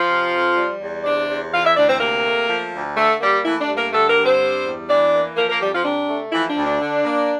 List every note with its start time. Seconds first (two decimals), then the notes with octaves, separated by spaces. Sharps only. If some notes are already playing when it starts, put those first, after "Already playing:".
Already playing: F3 F4
0.09 C3
0.33 F2
0.56 G3
0.81 E2
1.04 C3 D4 D5
1.29 E2
1.52 E3 F4 F5
1.65 E4 E5
1.77 D2 D4 D5
1.89 C4 C5
2.00 C3 A#3 A#4
2.25 A3
2.49 F3
2.73 D2
2.96 D3 A3 A4
3.21 G3 A#3 G4
3.45 E3 A3 E4
3.60 D4
3.68 G2
3.77 A#3 A#4
3.92 D3 A3 A4
4.09 A#3 A#4
4.17 G2
4.25 C4 C5
4.40 G3
4.65 E2
4.88 E3 D4 D5
5.13 A#3
5.36 F3 A#3 A#4
5.48 A#3 A#4
5.60 F2 G3 G4
5.73 F3 F4
5.84 C3 D4
6.08 A3
6.32 E3 F3 E4
6.49 D4
6.57 D2
6.65 D4
6.80 D3
7.05 A#3